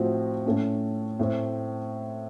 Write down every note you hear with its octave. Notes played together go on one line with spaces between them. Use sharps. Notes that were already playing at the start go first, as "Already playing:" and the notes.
Already playing: A2 F3 C4 F#4
A2 A3 C#4
A2 A3 C4